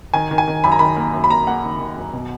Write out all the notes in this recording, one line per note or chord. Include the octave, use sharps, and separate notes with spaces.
D#3 G#5
D#3
G#5
D#3
F#2 B5
A#5
D#3 B5
A#3
F#2
B5
A#3 A#5
A#3 F#5
D#3
D#3
F#2
B2